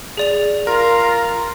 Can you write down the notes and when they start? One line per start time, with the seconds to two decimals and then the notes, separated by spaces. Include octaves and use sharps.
0.17 G#4 D5 F7
0.67 F4 A#4 A#5